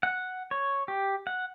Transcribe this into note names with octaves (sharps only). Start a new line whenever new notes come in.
F#5
C#5
G4
F#5